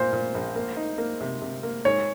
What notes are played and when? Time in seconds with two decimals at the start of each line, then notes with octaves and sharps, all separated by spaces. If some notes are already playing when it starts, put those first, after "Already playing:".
Already playing: A#2 C5
0.13 A#2
0.34 A#1
0.56 A#3
0.76 D#4
0.98 A#3
1.21 C3
1.42 C3
1.63 A#3
1.85 G#2 C#5